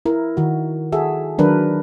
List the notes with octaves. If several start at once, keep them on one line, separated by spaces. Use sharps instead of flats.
E4 A#4
D#3 F#4
F#4 G#4 A4 E5
D#3 F#3 D4 A#4 B4